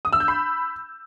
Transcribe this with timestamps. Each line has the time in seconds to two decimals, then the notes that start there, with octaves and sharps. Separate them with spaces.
0.05 D#6
0.13 E6
0.20 G6
0.28 B5